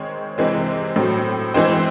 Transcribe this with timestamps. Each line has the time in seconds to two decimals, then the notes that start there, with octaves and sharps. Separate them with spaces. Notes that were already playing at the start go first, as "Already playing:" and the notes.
Already playing: D#3 G#3 C4 C#5
0.38 C3 E3 G#3 C4
0.96 A2 F#3 C4
1.54 E3 G#3 C4 C5